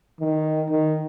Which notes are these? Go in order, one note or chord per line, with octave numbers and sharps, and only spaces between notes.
D#3
D#3